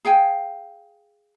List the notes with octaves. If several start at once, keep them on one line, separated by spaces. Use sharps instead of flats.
G#4 F5 G5 G#5